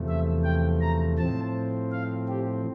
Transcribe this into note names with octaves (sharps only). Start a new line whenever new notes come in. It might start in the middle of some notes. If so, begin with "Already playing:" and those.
Already playing: E2 C3 F3 A3
E5
G5
A#5
A2 F3 C4 A5
F5
G4